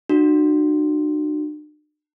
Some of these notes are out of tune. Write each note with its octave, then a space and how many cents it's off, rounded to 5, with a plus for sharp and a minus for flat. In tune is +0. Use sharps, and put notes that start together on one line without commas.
D4 +45 F#4 +0